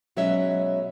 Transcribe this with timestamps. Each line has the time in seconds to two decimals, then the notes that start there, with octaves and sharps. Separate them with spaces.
0.16 B2 F#3 G#3 C#4 G#4 E5